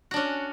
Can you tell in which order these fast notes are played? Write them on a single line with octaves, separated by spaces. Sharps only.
F#4 D4 C#4